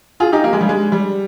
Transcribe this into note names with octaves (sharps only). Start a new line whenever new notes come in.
F4 G#4
D#4 G4
A#3
G#3
G3
G#3
G3